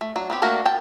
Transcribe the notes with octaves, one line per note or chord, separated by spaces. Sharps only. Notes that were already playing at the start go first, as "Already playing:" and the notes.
A3
F#3 D4
B3 C4 G4
A3 A#3 D4 F#4 A#4
G5 A5